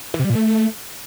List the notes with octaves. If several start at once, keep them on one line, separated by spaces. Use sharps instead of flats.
E3
C3
G3
A#2
A3